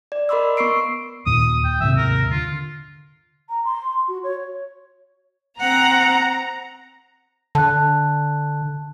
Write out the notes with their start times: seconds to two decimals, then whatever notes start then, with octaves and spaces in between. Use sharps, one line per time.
0.12 D5
0.29 A#4 D#5 B5 C6 D6 E6
0.57 B3 C#6 E6 C7 D7
1.26 D#2 A#2 D#6
1.64 G5
1.81 D#2 G#2 C3 E5
1.97 A#4
2.31 D3 F4
3.50 A#5
3.66 C6
4.08 F#4
4.24 C#5
5.61 C4 F#5 A#5
7.55 D3 A5 F#6